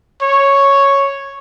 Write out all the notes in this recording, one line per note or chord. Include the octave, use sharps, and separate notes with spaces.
C#5